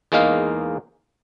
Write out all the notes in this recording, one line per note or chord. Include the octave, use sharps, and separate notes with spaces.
E2 G#3 A#3 D#4 F5